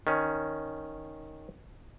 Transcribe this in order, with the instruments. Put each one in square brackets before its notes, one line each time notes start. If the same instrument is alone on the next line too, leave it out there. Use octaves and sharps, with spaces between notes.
[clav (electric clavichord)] D#3 C#4